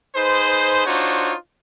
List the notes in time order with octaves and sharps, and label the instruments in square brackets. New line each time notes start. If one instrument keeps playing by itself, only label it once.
[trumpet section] D#4 G#4 B4 C5
D4 D#4 F4 F#4 C5 C#5